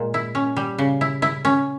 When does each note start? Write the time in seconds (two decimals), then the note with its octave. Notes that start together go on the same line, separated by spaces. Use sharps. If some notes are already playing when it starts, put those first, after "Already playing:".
Already playing: A#2 G#3
0.14 E4
0.35 C#4
0.57 G3
0.78 C#3
1.01 E4
1.22 E4
1.45 C#4